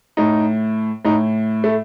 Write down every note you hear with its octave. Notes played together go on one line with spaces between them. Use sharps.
A2 D#4
A2 D#4
A3